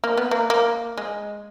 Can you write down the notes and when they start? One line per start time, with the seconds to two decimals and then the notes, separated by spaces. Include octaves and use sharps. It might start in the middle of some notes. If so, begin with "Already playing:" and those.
0.04 A#3
0.17 B3
0.31 A#3
0.50 A#3
0.98 G#3